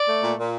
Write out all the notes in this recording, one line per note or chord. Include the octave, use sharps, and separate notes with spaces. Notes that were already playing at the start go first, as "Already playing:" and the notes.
Already playing: D5
A3
A#2
A#2